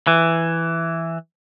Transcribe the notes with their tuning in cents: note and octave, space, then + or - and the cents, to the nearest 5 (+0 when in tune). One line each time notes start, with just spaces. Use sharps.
E3 +5